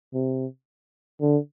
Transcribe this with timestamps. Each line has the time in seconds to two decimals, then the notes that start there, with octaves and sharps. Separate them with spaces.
0.14 C3
1.21 D3